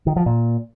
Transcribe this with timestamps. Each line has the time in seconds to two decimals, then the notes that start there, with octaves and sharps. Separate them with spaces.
0.07 D#3
0.16 F3
0.26 A#2